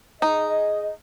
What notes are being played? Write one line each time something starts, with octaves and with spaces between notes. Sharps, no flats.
D#4 G#4 D#5